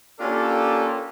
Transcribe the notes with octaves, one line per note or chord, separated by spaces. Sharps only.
A#3 C#4 D4 F4 G4 A4